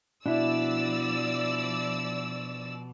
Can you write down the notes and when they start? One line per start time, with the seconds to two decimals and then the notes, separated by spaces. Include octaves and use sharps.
0.26 B2 F3 D4 E4 D5 E6